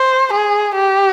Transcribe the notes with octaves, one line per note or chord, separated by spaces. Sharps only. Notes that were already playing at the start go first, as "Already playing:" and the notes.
Already playing: C5
G#4
G4